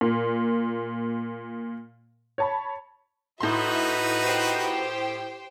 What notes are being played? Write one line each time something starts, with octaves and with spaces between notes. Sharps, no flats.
A#2
C#5 A5 B5
A2 D#4 F#4 B4 E5 C6
G4 C5 G5